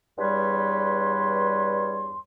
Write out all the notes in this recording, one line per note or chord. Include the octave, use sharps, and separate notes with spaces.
E2 G2 G3 B4 C#5 C6